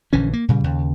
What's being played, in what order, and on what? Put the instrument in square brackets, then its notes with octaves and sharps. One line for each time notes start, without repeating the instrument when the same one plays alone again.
[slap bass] A#1 D3 E3 C#4
A#3
A#2 C#3 G3
D#2 C#3